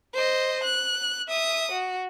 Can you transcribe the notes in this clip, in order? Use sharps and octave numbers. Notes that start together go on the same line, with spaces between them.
C5 D#5
F#6
E5 D#6
F#4